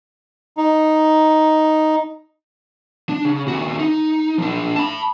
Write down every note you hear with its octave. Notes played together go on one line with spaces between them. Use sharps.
D#4
D4
C#3
D#2 F#4
D#4
F3 D4
A5 B5